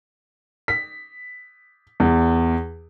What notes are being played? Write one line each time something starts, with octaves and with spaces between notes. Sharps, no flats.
B6
E2